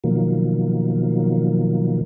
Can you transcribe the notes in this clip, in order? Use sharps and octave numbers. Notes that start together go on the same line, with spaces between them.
B2 D#3 F3 F#3 A#3